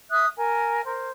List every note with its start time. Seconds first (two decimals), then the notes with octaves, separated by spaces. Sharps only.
0.10 E5 D#6 F#6
0.36 A#4 G#5
0.84 A#4 C5